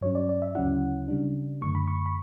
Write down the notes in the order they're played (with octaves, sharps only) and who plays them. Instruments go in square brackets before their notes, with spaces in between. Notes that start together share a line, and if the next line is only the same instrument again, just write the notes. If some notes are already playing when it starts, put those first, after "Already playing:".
[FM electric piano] G2 F#3 C#4 C#5
D5
D5
E5
D2 C#3 F#3 C#4 E4 F#5
C#3 G3 D4
F#2 D3 A3 C#6
B5
C#6
B5